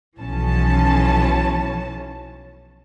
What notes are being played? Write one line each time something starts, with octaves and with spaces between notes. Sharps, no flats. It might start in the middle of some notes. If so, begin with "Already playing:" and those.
B1 E3 F3 C#4 A5